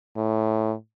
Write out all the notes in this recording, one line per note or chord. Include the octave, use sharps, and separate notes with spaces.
A2